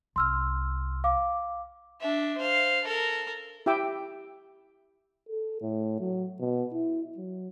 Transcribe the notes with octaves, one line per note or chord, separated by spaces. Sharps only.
C2 C6 E6 F6
F5 D6
D4 E5
C5 F5
A4 A#4
E4 G4 E5 G5 D6 E6
A4
A2
F#3
B2
E4
F#3